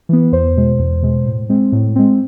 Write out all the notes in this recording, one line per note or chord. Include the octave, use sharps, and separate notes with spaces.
E3 B3
E2 C5
B2 G#3
E2
B2 G#3
A2
G#3 C4
A2
G#3 C4